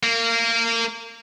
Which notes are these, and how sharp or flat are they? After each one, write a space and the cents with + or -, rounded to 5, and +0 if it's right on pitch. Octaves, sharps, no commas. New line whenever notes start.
A#3 -25